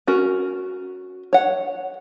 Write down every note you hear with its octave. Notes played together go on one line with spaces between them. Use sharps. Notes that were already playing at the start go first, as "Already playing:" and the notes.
C#4 F#4 A#4
C#5 F#5